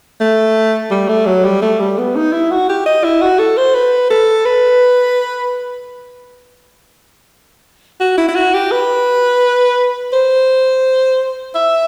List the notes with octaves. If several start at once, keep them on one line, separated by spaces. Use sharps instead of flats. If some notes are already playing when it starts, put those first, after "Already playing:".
A3
G3
A3
F#3
G3
A3
G3
B3
D#4
E4
F#4
G4
D#5
E4
F#4
A4
C5
B4
A4
B4
F#4
E4
E4
F#4
G4
B4
C5
E5